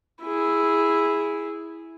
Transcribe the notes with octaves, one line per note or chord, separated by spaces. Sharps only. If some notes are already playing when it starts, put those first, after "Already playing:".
E4 G#4